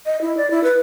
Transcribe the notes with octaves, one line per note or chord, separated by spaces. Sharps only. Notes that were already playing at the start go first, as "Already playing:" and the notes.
D#5
E4
D5
E4
B4